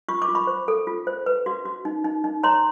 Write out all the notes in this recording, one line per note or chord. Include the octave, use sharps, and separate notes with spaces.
F4 C#6
D6
F4
B5 C#6
C5
A4
F4
C5
B4
F#4
F#4
D#4
D#4
D#4
C#5 A#5 C6